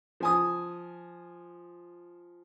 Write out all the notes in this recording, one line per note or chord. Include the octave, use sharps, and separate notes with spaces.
F3 G#5 D#6